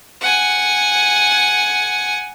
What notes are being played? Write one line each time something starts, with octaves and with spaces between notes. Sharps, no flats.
F#5 G#5